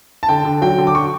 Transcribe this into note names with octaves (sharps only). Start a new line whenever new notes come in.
A5
D3 G5
D3
F#3 G5
D3
D6
F#3 C#6